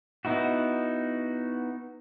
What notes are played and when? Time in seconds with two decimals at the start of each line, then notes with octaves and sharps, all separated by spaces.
0.25 B3 D#4 E4 F#4